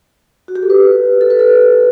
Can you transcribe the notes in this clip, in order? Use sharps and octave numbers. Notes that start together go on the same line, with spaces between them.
F#4
G4
A4
B4
A4
B4
A4